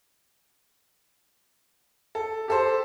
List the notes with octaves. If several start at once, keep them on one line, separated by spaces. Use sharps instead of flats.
A4
G4 A4 C5